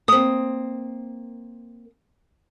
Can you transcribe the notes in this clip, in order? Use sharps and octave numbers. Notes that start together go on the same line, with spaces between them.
A#3 C4 D#6